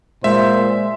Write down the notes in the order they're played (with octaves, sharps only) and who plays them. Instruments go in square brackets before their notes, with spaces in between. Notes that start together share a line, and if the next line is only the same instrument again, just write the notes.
[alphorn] A#2 [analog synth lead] G#3 [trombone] C5 [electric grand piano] E5